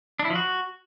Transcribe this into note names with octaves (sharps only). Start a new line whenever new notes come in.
D4
E4
F3
F#4